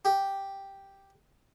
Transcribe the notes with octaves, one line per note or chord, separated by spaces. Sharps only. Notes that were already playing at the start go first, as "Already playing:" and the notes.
G4